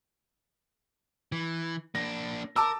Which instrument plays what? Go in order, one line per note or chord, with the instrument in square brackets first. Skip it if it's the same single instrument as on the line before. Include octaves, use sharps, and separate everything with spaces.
[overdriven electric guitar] E3
[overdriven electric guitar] A#3 D4 [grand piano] A#6
[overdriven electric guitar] A#4 [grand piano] A5 D6 E6